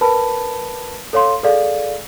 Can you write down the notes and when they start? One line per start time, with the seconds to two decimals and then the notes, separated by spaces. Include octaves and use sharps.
0.01 A#4 B4 A5 B5
1.13 A4 C#5 F5 C6
1.43 G#4 A4 D5 F5